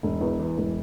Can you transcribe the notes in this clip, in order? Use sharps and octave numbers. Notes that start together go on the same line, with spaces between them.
E1
E2
E3
E1